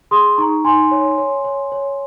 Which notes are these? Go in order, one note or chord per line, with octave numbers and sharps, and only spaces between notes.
G#4 C6 D#6
D#4 A#5 C#6
D#4 G#5 C6
C#5
C#5
C#5
C#5